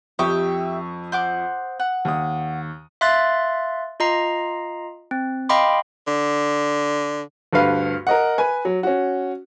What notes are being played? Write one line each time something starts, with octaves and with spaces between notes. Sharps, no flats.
F2 G4 E5 C#6 D#6
C5 F#5 D6
F#5
D#2 D#6
E5 F5 C6 F#6 A6
F4 D#5 A#5 C7
C4
D#5 F5 G5 B5 C6 D6
D3
D2 G2 B4 F5
A#4 D#5 F#5
B4 G#5
F#3
C#4 F#4